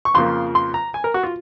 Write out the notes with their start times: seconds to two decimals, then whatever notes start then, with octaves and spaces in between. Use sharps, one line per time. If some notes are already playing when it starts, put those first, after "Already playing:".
0.05 C#6
0.14 F2 C#3 F3 A#3 C6
0.55 C6
0.74 A#5
0.94 G#5
1.04 A#4
1.14 F#4
1.23 F4